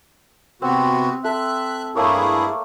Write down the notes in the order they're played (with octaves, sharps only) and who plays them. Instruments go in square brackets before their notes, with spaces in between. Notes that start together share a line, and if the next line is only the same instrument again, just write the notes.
[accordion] C3 B3 F#4 [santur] C4
[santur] A4 [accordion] E5 F#6
[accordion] G2 E4 G#4 [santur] A3 A#3 C#5